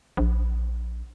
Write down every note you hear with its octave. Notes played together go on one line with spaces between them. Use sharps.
A#1